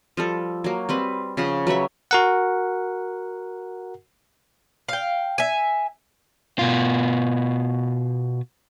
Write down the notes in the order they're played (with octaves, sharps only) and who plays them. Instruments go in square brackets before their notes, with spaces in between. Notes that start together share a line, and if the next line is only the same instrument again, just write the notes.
[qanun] F3 G3 A4
F#3 A#3
G3 C4 B4
C#3 F3 F#5
F#3 B4 C#5 E5
[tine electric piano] F#4 A#4 F#5
[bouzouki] F5 G5
E5 G#5
[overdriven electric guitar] B2 F4